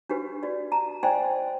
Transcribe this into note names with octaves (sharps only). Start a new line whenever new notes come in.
D4 F#4 G4 B4
F#4 D5
A5 A#5
C5 D5 D#5 G5 G#5 C6